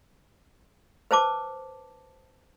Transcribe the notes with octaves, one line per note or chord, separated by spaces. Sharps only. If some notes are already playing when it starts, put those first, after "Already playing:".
B4 C5 A5 D6